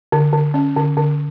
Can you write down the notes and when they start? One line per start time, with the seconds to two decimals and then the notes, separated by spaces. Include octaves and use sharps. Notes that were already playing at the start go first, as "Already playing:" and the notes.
0.12 D3
0.33 D3
0.54 C#4
0.76 D3
0.97 D3